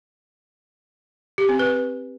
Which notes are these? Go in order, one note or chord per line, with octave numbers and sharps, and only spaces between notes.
G4
C4
B4